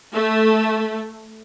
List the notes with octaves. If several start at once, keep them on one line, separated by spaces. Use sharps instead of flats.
A3